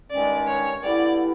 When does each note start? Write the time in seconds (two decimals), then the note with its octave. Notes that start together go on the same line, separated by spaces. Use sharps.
0.11 G2 D#3 G#3 C#4 D5
0.47 C#5
0.82 G2 D3 G3 B3 E4 D5